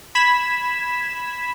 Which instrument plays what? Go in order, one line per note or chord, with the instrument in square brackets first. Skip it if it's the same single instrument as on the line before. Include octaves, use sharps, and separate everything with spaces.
[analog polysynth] B5 G#6 B6 E7